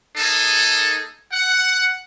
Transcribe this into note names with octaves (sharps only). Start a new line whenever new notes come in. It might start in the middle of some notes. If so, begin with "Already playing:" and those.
A#3 D#4 G#4 A4
F#5